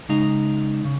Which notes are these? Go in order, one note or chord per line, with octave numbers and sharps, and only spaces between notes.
C#3 G#3 D#4
C#3